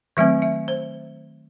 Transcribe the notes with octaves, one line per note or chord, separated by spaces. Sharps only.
D#3 F#3 A3 C4 E5
E5
C5